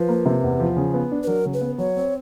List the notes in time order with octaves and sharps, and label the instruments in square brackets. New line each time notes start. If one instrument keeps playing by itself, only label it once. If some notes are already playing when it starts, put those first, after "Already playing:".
Already playing: [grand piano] F3 [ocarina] B4
[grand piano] A#3
C3
E2
F3
C#3
B3
D4
[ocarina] B4
[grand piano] F#3 [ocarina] A#4
[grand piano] C#3
[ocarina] B4
[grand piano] B3
[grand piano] F#3 [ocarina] C#5
[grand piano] C4